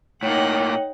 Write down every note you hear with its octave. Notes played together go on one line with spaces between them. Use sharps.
A2 A#3 D#4 C#5 F#5 G5